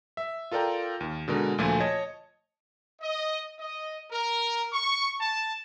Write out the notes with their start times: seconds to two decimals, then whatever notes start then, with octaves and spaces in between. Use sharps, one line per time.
0.17 E5
0.51 F4 A4 A#4 D5 G5 A#5
1.00 D#2
1.28 B2 D3 G#3 A#4
1.58 D2 A#2 F3 A3 F4 G#5
1.80 C#5 D#5 A5 G#6
3.01 D#5
3.59 D#5
4.10 A#4
4.71 C#6
5.20 A5